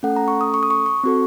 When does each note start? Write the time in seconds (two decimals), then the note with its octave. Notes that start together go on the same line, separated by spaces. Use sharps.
0.03 A3 C#4 A4 F#5
0.16 A#5
0.28 C#6
0.41 D#6
0.54 C#6
0.63 D#6
0.71 C#6
0.86 C#6
1.04 C4 F#4 A4